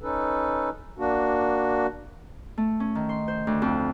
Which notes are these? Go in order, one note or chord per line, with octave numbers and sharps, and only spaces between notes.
C#4 D#4 A4 B4
A#3 D4 F#4
A3
C#4
D#3
C6
C5
D2
F2